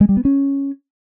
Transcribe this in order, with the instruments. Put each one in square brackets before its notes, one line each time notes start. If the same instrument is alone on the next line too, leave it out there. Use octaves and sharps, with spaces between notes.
[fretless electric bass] G#3
G3
B3
C#4